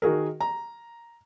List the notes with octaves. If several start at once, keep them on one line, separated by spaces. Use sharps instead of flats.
D#3 F#4 G#4 A#4
A#5